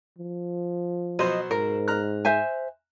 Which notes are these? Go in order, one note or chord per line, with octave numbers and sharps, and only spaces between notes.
F3
B2 F#3 C5 D#5
G#2 A#4
A#5 F6 F#6
C5 E5 G#5